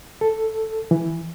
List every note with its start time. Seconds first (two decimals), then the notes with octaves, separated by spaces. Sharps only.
0.21 A4
0.91 E3